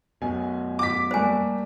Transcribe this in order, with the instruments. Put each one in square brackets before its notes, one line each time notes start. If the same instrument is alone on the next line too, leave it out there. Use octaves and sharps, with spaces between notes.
[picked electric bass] F#2 B2 [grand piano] G#5
[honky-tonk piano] D6 B6
[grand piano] G3 A3 A#3 [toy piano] C5 G#5